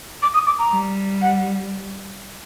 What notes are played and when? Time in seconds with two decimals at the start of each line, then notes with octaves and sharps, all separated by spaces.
0.22 D6
0.34 D#6
0.46 D6
0.59 A#5
0.71 G3
1.22 F#5